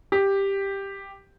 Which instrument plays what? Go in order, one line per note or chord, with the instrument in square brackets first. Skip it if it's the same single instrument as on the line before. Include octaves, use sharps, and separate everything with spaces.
[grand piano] G4